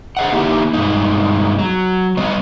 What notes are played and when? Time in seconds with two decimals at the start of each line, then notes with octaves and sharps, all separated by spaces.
0.17 G#4 D#5 F#5
0.32 A#3 D#4 E4 G4
0.73 G2 B2 G#3 D#4
1.59 F#3
2.17 G3 B3 C#5 D#5